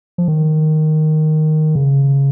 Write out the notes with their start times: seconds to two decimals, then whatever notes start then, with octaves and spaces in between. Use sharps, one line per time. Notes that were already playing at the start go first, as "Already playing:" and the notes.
0.18 F3
0.28 D#3
1.75 C#3